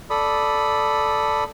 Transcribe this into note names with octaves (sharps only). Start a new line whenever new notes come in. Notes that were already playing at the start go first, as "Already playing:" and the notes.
A4 D5 B5 D#6